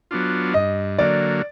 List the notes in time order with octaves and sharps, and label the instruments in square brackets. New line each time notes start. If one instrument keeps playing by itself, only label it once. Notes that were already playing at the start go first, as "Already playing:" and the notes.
[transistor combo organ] F#3 B3 D4 F4
[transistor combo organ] G2 [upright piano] D#5
[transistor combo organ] D3 F#3 A#3 [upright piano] D5